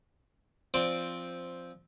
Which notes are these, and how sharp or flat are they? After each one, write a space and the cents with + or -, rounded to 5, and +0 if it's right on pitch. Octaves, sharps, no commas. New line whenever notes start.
F3 -5 C4 +0 D5 +0